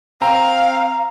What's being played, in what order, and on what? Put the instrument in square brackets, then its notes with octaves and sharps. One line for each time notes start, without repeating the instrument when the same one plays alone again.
[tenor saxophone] C4 [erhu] F5 [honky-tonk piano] A#5